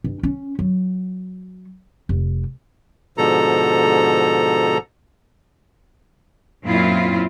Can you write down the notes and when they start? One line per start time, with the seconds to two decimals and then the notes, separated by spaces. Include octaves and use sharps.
0.04 G2
0.23 C#4
0.59 F#3
2.09 F1
3.18 G#2 B2 D3 F3 A4 A#5
6.64 F#2 A#2 C4 E4 F4